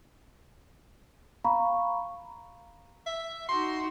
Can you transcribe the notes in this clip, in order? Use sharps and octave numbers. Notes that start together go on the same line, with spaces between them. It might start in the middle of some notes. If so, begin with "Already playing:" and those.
F5 A#5 B5 C#6
E5
D#4 F#4 C6